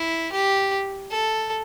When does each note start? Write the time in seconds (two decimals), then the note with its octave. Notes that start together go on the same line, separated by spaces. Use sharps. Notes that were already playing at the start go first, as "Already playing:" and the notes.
Already playing: E4
0.33 G4
1.11 A4